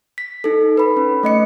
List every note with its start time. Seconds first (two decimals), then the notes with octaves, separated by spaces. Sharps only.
0.18 B6
0.44 D#4 A4
0.77 B4 B5
0.97 C#4
1.23 A3 D#5 C#7